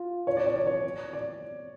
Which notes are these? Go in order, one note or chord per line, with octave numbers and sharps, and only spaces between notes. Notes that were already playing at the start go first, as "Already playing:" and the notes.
Already playing: F4
C#5
D5
C#5
D5
C#5
D5